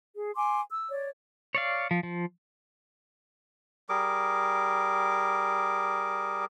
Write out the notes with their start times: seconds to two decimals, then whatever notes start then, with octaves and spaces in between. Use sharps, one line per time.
0.15 G#4
0.35 G#5 C6 D6
0.71 E6
0.89 C#5 D5
1.55 C#5 D5 F5
1.91 F3
2.03 F3
3.89 G3 G#4 A#4 D6